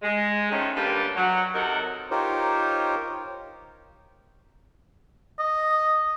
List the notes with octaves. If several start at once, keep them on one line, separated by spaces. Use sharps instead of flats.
G#3
D#3 F3 G#3 A3 C#4
D3 G3 A#3 G4 B4
F#3
C3 F#3 D#4 A4 A#4 F#5
D#4 F4 G4 A#4 C5 C#5
D#5